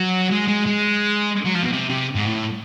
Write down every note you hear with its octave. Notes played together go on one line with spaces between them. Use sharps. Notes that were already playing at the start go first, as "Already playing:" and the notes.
Already playing: F#3
G#3
G#3
G#3
F#3
F3
B2
C3
C3
G#2
A2